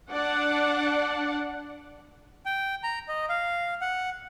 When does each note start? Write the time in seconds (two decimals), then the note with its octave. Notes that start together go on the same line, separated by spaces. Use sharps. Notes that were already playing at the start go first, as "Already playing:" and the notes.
0.11 D4 D5 F#5
2.46 G5
2.83 A#5
3.08 D#5
3.29 F5
3.81 F#5